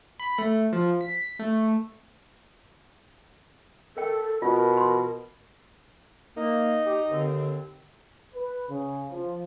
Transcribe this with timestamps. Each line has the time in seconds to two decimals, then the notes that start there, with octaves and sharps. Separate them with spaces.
0.19 B5
0.38 A3
0.73 F3
1.01 B6
1.39 A3
3.97 A4 A#4 G5
4.42 B2 F4 A#4
4.77 C6
6.37 A#3 D#4
6.86 G4
7.11 D#2 D3 C4
8.34 B4
8.69 C#3
9.11 F3